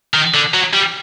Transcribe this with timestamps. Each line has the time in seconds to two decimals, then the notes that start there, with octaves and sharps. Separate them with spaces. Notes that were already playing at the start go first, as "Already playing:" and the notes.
0.14 D#3
0.34 D3
0.54 F#3
0.73 G3